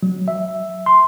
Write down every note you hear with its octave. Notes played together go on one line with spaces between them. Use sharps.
F#3
E5
C6